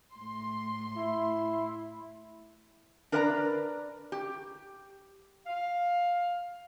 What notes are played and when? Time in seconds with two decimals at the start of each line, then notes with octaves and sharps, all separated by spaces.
0.14 A2 C6
0.97 E4
3.12 D4 A#4 B4 D5 A5 A#5
4.12 G4
5.46 F5